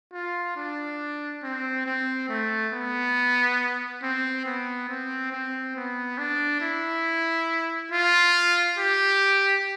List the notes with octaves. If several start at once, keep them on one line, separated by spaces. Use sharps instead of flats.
F4
D4
C4
C4
A3
B3
C4
B3
C4
C4
B3
D4
E4
F4
G4